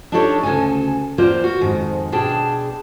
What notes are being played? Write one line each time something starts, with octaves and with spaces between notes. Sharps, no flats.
D4 D#4 F4 G4 A4 C#5
D2 A#2 C#3 A4 G#5
E2 A#3 C4 F4 C5 D5
F#4
F2 G#2 D#3
B2 D4 G#4 G5 A5